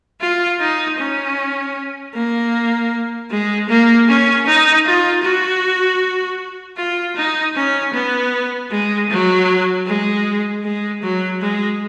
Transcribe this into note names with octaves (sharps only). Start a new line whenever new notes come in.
F4
D#4
C#4
A#3
G#3
A#3
C#4
D#4
F4
F#4
F4
D#4
C#4
B3
G#3
F#3
G#3
G#3
F#3
G#3